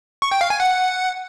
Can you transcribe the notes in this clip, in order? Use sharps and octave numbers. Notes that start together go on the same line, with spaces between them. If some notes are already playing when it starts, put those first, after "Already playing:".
C#6
G5
F5
G#5
F#5